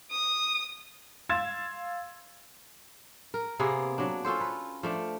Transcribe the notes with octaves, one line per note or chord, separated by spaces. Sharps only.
D#6
F5 C6 E6 G#6 A6 E7
A#4
C3 A#3 B3 G#4
F#3 D4
C#4 F4 A4 C5
B4
F3 A3 D4